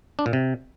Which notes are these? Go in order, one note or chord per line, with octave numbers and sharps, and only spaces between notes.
D4
A#2
C3